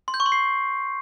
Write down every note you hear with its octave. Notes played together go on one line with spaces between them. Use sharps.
C6
G6
C#6
C6
C7